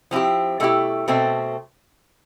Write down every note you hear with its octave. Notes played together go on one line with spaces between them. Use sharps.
F3 C4 E4 G4
B2 A3 E4 G4
B2 A3 C4